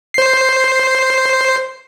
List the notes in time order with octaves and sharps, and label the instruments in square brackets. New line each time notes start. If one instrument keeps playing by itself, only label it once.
[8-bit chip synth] C5 C7